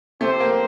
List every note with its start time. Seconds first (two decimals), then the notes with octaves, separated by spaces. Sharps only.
0.21 A3 C4 G4 C5
0.40 A#3